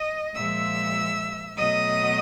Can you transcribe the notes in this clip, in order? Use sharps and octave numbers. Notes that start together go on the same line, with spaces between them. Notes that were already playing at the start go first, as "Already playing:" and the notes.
Already playing: D#5 D#6
A#2 F3 G#3 E5 E6
B2 F#3 A3 D#5 D#6